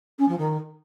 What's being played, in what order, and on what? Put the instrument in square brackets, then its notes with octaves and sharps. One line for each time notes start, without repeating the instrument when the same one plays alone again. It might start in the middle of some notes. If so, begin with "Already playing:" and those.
[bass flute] C#4
F3
D#3